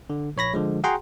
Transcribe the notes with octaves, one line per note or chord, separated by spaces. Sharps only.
D3
A#1 C#5 B5 A#6
D3 F3 G#3
F#4 G#4 F#5 G5 A#5 C6